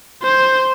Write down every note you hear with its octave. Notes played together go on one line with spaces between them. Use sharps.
C5